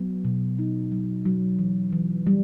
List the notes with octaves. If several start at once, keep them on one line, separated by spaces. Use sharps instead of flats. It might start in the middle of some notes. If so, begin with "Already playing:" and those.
Already playing: F#3 B3
B2
D#4
F#3
F#3
E3
E3
G3